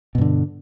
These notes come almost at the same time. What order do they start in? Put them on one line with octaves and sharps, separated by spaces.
B2 G2 D3